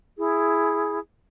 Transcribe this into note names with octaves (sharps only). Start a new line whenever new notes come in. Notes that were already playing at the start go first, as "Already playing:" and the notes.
E4 G#4